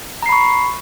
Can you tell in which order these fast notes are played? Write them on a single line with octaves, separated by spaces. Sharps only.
A#5 C7 B5 C#6